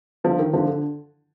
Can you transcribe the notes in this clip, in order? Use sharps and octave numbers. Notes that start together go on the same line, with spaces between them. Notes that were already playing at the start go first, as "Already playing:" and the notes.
D3 F3
D#3
D3 F3
D3